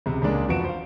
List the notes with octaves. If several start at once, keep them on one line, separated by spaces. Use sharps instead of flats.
C#2 C3
C#2 C#3 G#3 A#3 D4 D5
F1 F3 F#4 B4 D7 E7
C5 F5